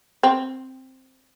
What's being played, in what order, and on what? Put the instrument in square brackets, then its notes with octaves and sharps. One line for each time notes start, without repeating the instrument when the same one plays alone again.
[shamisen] C4